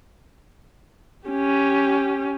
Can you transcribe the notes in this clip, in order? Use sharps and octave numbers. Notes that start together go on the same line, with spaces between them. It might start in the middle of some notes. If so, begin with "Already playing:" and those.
C#4 G4